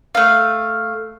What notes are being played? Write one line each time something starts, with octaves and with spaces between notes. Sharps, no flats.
A3 F5